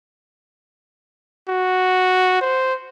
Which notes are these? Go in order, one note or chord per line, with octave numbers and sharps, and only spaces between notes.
F#4
C5